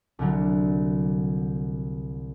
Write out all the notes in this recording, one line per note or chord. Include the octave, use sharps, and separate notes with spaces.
C2 D3 F#3